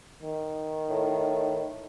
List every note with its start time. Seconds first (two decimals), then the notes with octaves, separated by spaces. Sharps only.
0.22 D#3
0.90 A2